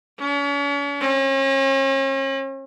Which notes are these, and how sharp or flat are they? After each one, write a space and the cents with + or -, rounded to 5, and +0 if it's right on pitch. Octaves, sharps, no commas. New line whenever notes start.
C#4 +40
C#4 -40